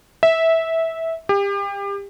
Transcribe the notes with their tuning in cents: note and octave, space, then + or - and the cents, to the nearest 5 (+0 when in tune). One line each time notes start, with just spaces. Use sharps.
E5 -15
G4 +30